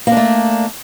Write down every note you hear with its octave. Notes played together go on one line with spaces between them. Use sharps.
A3 A#3 D4